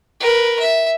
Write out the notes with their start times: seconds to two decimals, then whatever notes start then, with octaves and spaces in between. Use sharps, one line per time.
0.20 A#4 B4
0.60 E5